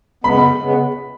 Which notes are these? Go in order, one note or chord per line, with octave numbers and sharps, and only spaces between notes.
F#2 C#3 G#3 B3 B5
C#3 G#3 B3